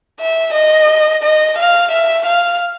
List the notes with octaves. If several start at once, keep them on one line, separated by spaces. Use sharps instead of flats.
E5
D#5
D#5
F5
E5
F5